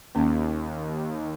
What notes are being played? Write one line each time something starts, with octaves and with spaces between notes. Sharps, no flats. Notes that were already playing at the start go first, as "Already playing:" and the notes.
D#2 A#3 C#4